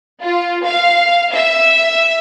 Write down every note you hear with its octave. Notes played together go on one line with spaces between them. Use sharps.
F4
F5
E5